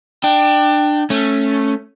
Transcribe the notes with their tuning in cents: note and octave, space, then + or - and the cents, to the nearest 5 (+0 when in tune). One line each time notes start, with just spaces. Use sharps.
D4 +25 G5 +0
A3 +0 C#4 -15